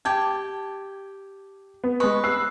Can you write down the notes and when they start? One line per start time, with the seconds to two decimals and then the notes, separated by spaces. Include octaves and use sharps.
0.05 G4 G5 A5 G#6
1.84 B3
2.00 G#3 B4 D#5 C#6
2.24 E6 F#6 C7